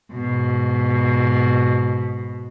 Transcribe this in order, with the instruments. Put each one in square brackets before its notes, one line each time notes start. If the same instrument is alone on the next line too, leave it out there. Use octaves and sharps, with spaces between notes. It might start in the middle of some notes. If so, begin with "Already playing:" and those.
[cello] G#2 B2